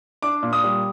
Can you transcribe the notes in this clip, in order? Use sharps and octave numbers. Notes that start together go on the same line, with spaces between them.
D4 D6
A#2
D#6
G3